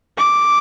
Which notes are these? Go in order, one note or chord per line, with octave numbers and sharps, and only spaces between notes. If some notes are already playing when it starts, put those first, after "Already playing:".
D6